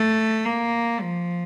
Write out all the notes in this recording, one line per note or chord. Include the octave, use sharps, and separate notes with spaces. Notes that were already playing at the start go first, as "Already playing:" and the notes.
Already playing: A3
A#3
F3